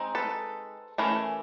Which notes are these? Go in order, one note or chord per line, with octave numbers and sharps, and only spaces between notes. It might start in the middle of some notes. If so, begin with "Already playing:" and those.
Already playing: G#3 C4 D#4
A4 B4
E3 A3 C#4 G#4 A#4